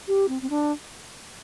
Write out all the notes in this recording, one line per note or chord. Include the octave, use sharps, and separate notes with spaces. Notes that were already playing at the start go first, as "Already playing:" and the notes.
G4
C4
C4
D4